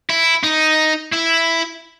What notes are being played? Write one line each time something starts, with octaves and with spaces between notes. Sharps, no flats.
E4
D#4
E4